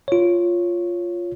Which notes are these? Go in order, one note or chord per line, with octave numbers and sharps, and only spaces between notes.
F4 C#5